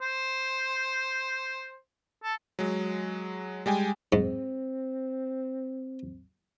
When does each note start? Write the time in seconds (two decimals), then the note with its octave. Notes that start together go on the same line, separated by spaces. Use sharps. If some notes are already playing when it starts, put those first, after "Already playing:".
0.02 C5
2.24 A4
2.59 F#3 G#3
3.66 G3 G#3 G5 G#5
4.12 G#2 C4